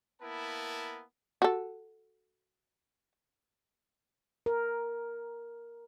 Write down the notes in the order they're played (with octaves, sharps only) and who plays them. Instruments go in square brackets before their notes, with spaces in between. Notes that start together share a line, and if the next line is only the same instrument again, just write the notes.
[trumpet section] A#3 B3 E4 A#4 A5
[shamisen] F#4 A4
[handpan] A#4